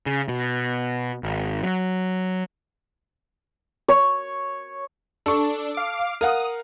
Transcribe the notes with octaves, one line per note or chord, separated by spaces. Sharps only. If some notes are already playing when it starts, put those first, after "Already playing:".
C#3
B2
G#1
F#3
C#5
D4 A4 C#6
F5 D6
A#4 F5 F#5 D#6